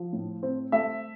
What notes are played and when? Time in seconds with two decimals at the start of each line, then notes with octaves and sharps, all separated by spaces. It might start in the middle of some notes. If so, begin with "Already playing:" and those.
Already playing: F3
0.13 A2
0.43 C4
0.72 A3 E5